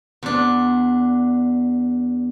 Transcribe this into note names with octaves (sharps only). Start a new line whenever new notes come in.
E2 D4